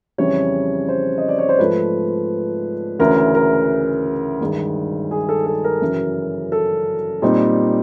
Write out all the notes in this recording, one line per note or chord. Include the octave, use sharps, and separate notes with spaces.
F2 C#3 E3 G3 C#5
C5
D#5
D5
C#5
C5
G#2 F3 A3 B4
D2 C#3 E3 A#4
A#4
G2 D#3 G#3
G#4
A4
A4
A#4
F#2 C#3 E3
A4
A#2 G3 C4 D#4